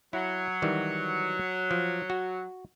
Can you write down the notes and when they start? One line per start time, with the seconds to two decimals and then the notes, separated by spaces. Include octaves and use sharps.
0.13 F#3 E4
0.62 D#3 E3 G3
1.71 F3
2.10 F#4